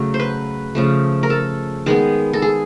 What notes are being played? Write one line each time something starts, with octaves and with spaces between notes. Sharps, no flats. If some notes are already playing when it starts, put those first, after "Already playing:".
Already playing: C#3 F#3 A3
C5
B4
C#3 F3 A3
A#4
A4
D#3 G#3 B3 G#4
A4
G#4